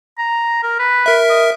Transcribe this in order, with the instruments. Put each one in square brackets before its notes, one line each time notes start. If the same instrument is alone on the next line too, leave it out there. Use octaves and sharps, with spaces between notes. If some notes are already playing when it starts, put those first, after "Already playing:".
[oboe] A#5
A#4
B4
[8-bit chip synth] A#4 E5
[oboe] D#5